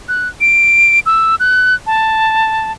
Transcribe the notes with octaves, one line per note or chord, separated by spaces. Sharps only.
F#6
D7
E6
F#6
A5